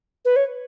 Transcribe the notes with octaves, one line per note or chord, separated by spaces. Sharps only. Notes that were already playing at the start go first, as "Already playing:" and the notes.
B4
C#5